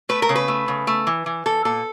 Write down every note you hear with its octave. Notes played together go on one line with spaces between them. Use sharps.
A3 B4
A#4
C#3
B4
A3
C#3
A3
E3
E3
E3 A4
A#2 A4